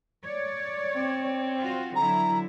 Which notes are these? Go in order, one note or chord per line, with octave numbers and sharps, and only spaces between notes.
C#5 D5
C4
F4 F#4
D3 F#3 E4 A#5